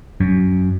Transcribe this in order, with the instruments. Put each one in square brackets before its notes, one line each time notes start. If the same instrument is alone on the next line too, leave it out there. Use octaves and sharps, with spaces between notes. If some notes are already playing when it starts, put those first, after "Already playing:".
[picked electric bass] F#2